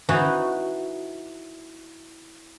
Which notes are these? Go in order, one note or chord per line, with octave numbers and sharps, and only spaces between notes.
E3 D#4 F#4